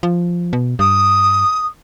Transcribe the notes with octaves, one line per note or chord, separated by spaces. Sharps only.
F3
B2
G2 D#6